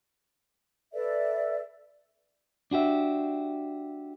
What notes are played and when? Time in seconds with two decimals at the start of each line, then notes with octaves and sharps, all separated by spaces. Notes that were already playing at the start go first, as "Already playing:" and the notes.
0.93 A4 B4 D5 E5
2.71 D4 F#4 G4 E5